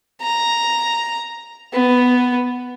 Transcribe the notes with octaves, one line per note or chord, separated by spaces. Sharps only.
A#5
B3